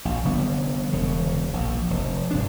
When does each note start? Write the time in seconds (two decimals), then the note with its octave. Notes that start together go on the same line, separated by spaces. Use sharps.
0.05 A#1
0.24 F1 D3 G3 B3
0.92 E1 C#3
1.53 A#1
1.90 F1
2.31 G2 C3 D4